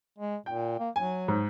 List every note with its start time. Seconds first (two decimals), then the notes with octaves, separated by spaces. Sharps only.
0.18 G#3
0.46 A#2 G5
0.80 A#3
0.96 F#3 G#5
1.28 G#2